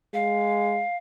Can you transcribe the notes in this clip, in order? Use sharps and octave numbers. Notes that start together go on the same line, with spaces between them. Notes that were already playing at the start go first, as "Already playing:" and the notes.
G#3 F5